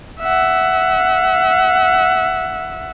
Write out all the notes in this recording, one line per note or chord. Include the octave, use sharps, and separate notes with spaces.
E5 F#5